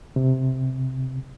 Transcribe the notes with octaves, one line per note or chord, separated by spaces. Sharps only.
C3